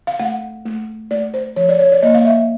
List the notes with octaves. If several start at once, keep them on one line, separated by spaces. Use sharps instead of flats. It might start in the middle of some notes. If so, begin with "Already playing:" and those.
F5
A3 F#5
A3
A3 D5
C5
F3 C#5
D5
C#5
D5
A#3 D#5
F5
E5